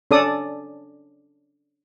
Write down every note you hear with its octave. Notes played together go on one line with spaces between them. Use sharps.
C#4 D4 A4 D5 D#6